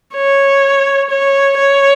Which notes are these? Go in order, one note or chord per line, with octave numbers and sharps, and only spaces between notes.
C#5
C#5
C#5